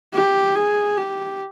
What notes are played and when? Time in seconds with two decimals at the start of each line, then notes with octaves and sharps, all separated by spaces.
0.14 G4
0.55 G#4
0.97 G4